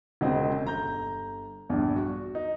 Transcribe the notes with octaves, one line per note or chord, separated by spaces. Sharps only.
E1 C#3 C4 D#5
G1 A#5 G6
A#1 E2 G2
F#4
D#4